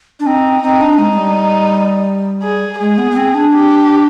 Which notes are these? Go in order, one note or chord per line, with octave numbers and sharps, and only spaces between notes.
D4
C4 D#4
C4 D#4
D4
G#3 D#4
G#3
G3
G#4
G#3 G#4
B3
B3
C4
D4
G4